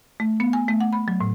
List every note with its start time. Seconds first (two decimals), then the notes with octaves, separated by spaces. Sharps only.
0.20 A3
0.40 B3
0.53 G#5
0.68 A3
0.80 F#5
0.93 B5
1.08 F#3
1.21 A2